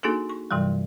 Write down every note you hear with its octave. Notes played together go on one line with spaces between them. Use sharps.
A#3 D4 D#4 F#4 G#4 A4
C#6
G2 C3 E3 F#3 G3